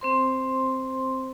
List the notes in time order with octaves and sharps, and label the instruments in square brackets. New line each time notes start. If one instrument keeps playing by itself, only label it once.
[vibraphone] C4 C5 C6